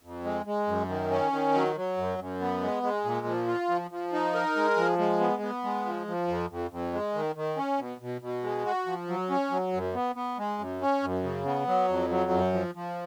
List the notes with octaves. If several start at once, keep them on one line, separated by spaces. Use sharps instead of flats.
F2
G#3
G#3
F#2
D#3
C#4
D#3
F#3
F#3
F#2
F#2
B3
G#3
G#3
A#2
F3
F4
F3
F3
D#4
A#4
G#3
F3
G#3
B3
B3
G#3
F3
F3
F2
F2
F2
G#3
D#3
D#3
C#4
B2
B2
B2
G#3
F#4
F3
F#3
C#4
F#3
F#2
B3
B3
G#3
F#2
C#4
F#2
C#3
B3
F#3
F2
F#3
F#2
F3
F3